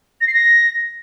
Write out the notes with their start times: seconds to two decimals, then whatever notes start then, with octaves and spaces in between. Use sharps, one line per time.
0.21 A#6
0.27 C7
0.34 A#6